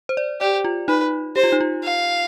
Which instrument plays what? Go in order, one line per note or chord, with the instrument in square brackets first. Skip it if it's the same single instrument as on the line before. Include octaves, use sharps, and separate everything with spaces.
[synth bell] C5
D5
[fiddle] G4 [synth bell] D5
[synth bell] F4
[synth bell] D#4 [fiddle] B4
[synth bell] G4 [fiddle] C5
[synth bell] F4
D#4
F4
[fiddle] F5